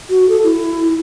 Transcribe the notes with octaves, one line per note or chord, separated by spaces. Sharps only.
F#4
A4
E4